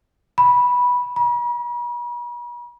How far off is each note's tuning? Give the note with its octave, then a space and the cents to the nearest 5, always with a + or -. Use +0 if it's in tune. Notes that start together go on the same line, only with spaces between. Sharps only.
B5 -10
B5 -45